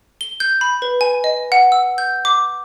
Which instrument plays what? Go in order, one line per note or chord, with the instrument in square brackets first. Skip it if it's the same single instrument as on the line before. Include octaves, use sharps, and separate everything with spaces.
[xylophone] G7
G6
B5
B4
G#5
D#5
F#5
E6
G6
D6